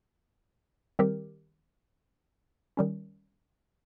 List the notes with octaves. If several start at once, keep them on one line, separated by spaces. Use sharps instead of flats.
D#3 G3 C4 G4 A#4
D#3 G3 C#4